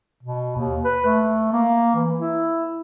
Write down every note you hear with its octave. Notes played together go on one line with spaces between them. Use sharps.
B2
D#2
B4
A3
A#3
E3
E4